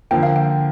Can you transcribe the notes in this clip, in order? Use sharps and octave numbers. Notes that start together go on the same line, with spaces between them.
D3 F3 A#3 G5
F5
G5